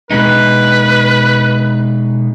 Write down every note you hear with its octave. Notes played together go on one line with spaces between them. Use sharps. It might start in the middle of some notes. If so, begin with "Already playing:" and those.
B2 G#3 D#4 B4